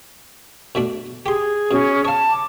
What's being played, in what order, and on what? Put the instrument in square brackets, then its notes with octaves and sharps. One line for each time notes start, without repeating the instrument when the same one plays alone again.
[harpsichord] B2 A3 D4
[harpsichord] G4 C6 [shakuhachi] G#4
[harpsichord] B2 [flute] C#4
[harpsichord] C#5 F5 [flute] A5
[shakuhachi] D6